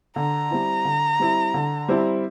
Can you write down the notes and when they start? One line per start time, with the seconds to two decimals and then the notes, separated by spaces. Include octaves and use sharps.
0.16 D3 A#5
0.51 G3 C4 E4
0.85 D3
1.20 G3 C4 E4
1.54 D3
1.88 G3 C4 E4